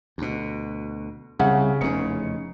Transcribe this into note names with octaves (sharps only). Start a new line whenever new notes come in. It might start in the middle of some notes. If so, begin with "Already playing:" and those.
D2 B2
C2 C#3 E5 F#5
F1 E2 C#3 C#4 D#4 C#7